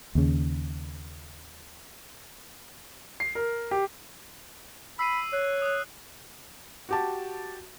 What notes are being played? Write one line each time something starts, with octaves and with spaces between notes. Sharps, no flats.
D#2 C#3
C7
A#4
G4
B5 E6 C7 D#7
C#5 F#6 C7
D#6 F#6
F#4 G4 A5